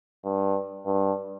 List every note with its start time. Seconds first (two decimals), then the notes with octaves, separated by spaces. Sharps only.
0.24 G2
0.86 G2